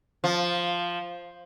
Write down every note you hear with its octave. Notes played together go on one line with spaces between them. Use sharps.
F3